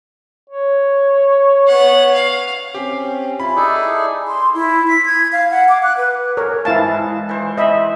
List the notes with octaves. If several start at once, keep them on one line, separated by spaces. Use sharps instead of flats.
C#5
B3 F#5
F5
C4 C#4 G4
E4 F4 B5
D#4 E4 G#4 A4 D5
C6
E4
B6
G#6
F5
F#5
D6
F#6
B4
A#4 C#5
G#2 E3 E4 F5 A5
E3 C5
D#5 E5 B5